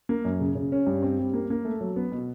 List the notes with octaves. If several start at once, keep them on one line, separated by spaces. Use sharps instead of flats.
A#3
F#2
C#3
C#3
C#4
G2
C4
G3
A#3
A#3
A3
F#3
B3
B2